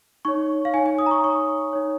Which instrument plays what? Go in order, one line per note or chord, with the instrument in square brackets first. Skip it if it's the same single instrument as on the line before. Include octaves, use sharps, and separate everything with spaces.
[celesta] D#4 C#5 C#6
F5
D#4 C#5 G#5
G#5
D#6
A#5
C#6
D#4 C#5 C#6
D#4 C#5